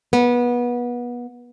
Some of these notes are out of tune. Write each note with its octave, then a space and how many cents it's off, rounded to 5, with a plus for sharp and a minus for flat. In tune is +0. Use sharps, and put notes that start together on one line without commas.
B3 -25